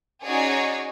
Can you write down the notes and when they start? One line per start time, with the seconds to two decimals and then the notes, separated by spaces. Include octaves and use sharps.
0.24 C#4 D#4 F#4 G#4 C#5 D5